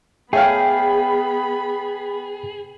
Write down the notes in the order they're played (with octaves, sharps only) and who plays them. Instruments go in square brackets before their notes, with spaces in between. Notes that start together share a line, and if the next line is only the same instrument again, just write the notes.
[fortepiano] A3 C#5 F5 [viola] B3 B5 [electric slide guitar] G#4 [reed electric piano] G5